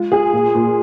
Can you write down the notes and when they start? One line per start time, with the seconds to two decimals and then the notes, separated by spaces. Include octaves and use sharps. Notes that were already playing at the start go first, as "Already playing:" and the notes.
Already playing: G#3 F4
0.12 G#4
0.33 A#2
0.55 A#2